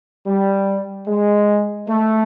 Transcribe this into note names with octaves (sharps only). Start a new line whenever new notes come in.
G3
G#3
A3